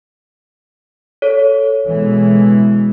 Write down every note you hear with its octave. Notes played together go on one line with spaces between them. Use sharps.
A4 C#5
B2 E3 G#3